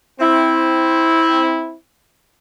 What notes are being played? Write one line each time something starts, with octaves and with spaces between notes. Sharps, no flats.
C4 E4